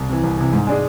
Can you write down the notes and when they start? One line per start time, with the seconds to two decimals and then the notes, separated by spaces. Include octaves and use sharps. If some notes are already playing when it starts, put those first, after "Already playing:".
Already playing: C2
0.09 C3 E3
0.24 C2
0.37 C3 E3
0.53 G#2
0.67 G#3 D4 G#4